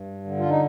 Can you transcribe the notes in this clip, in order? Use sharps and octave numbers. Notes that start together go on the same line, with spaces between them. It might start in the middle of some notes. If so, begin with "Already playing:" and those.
Already playing: G2
D3
F4
D#4